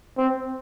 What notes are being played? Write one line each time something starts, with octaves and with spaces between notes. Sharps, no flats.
C4